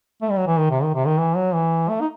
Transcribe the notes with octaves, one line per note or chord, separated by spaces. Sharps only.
A3
G3
F#3
E3
D#3
C3
D#3
C3
D#3
E3
F#3
E3
A3
D#4